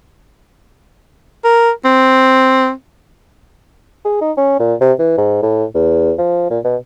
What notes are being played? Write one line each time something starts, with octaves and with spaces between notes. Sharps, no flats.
A#4
C4
G#4
D#4
C#4
A#2
C3
E3
G#2
A2
E2
F3
A#2
B2